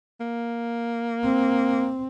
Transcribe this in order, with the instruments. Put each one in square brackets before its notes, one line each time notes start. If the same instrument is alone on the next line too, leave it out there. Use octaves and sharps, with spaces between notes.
[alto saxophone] A#3
[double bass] C4